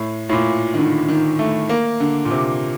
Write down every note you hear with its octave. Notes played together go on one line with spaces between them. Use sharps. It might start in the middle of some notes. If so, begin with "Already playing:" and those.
Already playing: A2
A2
A#2
D#3
D3
D#3
A3
A#3
D3
A#2
C3